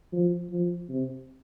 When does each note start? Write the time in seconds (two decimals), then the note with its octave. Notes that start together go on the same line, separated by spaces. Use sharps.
0.12 F3
0.51 F3
0.89 C3